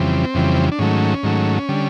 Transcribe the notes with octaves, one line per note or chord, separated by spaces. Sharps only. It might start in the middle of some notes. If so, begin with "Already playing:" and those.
Already playing: F2 C#3 E3 G3 C4
F2 C#3 E3 G3
D4
G#2 D#3 F#3 A3 C#4
G#2 D#3 F#3 A3
D3 G3